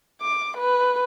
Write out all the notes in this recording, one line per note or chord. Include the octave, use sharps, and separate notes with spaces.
D6
B4